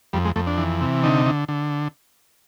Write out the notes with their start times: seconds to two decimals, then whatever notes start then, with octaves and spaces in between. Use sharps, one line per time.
0.13 F2 G3
0.25 G#3
0.36 F2 A3
0.47 D4
0.58 E3
0.81 C3
1.04 D3 D#4
1.26 D3
1.49 D3